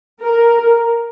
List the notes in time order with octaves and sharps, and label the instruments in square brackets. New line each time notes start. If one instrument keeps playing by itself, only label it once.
[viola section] A#4